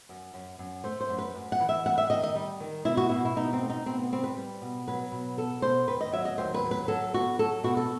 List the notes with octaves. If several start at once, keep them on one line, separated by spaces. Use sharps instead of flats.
F#2
F#2
F#2
A3 C5
C5
F#2
B4
F#2
F#5
E3
E5
G3 F#5
E5
D#3 D#5
D#5
G3
D#3
B2 E4
F#4
B2 E4
E4
B2 D#4
C4
A3
D#4
B2 C4
B3
G3 C4
B4
G3
B2
F#3 B4
B2
B3 A4
B2 C5
D#2 B4
D#5
F#3 E5
D#5
D#2 C5
B4
F#3
B4
F#3 A4
B3 F#4
F#3 A4
B2 F#4
A4